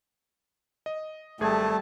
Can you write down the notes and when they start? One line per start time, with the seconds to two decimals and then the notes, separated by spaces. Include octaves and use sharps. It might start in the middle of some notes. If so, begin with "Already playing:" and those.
0.86 D#5
1.41 G#1 G3 A3 G#4 A5 G#6